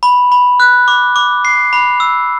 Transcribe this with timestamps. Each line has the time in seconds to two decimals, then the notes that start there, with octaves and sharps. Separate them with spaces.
0.03 B5
0.32 B5
0.60 F#6
0.88 D6
1.16 D6
1.45 C7
1.73 B5
2.00 E6